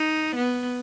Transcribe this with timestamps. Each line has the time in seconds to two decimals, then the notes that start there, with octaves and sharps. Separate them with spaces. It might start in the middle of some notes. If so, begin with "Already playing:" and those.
Already playing: D#4
0.36 B3